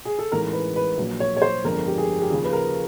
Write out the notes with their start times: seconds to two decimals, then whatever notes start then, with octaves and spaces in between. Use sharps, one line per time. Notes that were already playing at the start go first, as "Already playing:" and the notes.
0.05 G#4
0.19 A4
0.32 A1 G#2 E3 G#3 A#4
0.53 B4
0.76 B4
0.98 A#1 A#2 F#3
1.20 C#5
1.37 C#5
1.42 C5
1.64 G1 F2 D3 F3 G#3 A#4
1.88 G4
1.98 G#4
2.22 G4
2.30 D#2 C#3 F3 G#4
2.44 B4
2.53 A#4